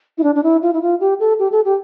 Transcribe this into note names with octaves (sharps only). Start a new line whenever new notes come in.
E4
D4
D4
E4
F4
E4
F4
G4
A4
G4
A4
G4